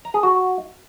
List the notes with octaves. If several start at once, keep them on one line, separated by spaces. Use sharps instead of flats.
A#5
G#4
F#4